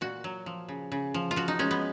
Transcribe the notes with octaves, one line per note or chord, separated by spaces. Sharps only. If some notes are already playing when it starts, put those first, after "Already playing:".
A#2 F#4
F#3
F3
C#3
C#3
F3
F4
F3 F#4
D#4
G#3 C#4
B3